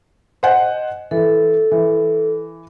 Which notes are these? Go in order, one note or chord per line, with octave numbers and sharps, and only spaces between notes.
C5 D#5 F#5 G#5
E3 A4
E3